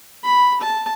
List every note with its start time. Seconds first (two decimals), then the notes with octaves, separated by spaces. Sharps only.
0.23 B5
0.61 A5